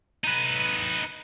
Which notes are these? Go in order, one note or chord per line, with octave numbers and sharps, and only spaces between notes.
D#4 B4